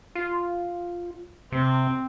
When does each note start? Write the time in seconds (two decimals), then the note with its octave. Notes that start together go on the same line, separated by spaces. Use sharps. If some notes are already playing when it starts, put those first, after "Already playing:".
0.15 F4
1.52 C3 C4